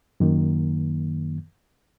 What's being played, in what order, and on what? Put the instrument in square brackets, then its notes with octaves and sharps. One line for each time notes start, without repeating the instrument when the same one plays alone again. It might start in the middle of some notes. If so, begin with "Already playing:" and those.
[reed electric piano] F#2 D#3 A#3